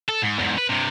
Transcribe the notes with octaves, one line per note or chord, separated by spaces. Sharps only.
A4
G#2
E2 G#2
B4
G2 C3